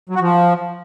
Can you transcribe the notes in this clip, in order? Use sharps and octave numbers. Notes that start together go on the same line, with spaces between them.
F#3
F#4
F3